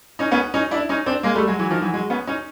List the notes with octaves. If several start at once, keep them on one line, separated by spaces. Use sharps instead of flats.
C#4 D#4
B3 C#4
C#4 D#4
D4 E4
C#4 D#4
C4 D4
G#3 A#3
G3 A3
F#3 G#3
E3 F#3
D#3 F3
E3 F#3
F#3 G#3
B3 C#4
C#4 D#4